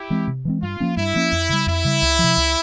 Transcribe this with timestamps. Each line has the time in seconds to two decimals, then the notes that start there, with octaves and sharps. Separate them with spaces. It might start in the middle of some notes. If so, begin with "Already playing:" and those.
Already playing: E4 G4
0.10 E3 G#3 C4
0.27 C3
0.45 E3 G#3 C4
0.62 G2 F4
0.80 F3 A#3 C#4
0.97 G2 E4
1.15 F3 A#3 C#4
1.32 F2
1.49 C#3 G3
1.67 F2 E4
1.85 C#3 G3
2.02 C#2
2.19 C3 F3
2.37 C#2